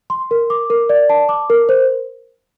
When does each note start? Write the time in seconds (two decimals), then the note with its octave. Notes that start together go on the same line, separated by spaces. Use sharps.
0.10 C6
0.31 A#4
0.50 D6
0.70 A#4
0.89 D5
1.09 A5
1.29 D6
1.50 A#4
1.69 C5